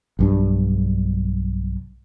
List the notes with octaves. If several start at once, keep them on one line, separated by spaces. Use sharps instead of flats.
B1 G2 D4